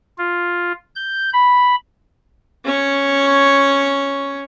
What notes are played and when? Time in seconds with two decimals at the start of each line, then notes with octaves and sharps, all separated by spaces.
0.18 F4
0.96 G6
1.33 B5
2.65 C#4 C#5